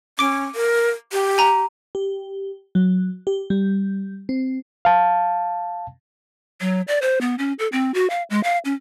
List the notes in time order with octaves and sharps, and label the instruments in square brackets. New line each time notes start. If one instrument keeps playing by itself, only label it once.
[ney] C#4 [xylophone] D6 D7
[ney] A#4
G4
[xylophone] G#5 A#5
[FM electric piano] G4
F#3
G4
G3
C4
[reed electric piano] F5 A5
[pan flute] F#3
D5
C5
B3
C#4
A4
C4
F#4
F5
G#3
F5
C#4